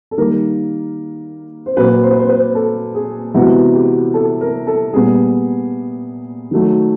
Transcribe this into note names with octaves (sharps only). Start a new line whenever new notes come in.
A4
D#3 G3 A#3 A#4
C5
A#2 F#3 A#3 B4
C5
B4
C5
B4
A4
G#4
C3 E3 G#3 B3 F#4
G4
A4
A#4
A4
A#2 G3 B3 G#4
D#3 F#3 A3